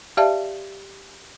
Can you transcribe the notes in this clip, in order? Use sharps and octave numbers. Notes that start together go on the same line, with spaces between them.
G4 D5 E5 F5 A5